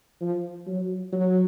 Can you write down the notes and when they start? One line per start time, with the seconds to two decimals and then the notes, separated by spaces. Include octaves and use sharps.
0.21 F3
0.67 F#3
1.12 F#3